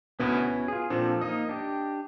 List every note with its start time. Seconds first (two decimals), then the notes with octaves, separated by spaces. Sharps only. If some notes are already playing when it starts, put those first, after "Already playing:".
0.20 D2 B2 B3 C#4 E4 B4
0.38 F#4
0.68 F4 G#4
0.90 A#2 F3 C4 D4 A4
1.21 A#3 D#4 D#5 D#6
1.49 D4 G4